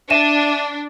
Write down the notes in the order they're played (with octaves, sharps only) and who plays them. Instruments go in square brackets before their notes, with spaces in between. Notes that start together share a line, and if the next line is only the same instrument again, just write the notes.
[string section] D4 [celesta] E5 D#7 E7